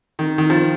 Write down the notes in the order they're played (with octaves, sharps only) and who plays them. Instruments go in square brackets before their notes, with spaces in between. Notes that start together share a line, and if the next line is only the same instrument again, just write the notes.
[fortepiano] D#3
D#3
F3